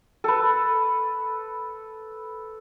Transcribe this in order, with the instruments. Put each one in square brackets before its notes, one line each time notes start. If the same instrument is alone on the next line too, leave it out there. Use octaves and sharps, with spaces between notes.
[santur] A4 B4